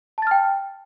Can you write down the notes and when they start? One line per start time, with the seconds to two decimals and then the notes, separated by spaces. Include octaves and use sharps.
0.18 A5
0.22 A6
0.27 F6
0.31 G5